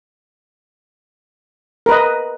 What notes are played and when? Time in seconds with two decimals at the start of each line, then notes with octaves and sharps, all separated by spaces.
1.86 A#4
1.89 B4
1.92 D#5